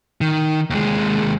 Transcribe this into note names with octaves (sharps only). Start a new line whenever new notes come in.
D#3
D#2 G#3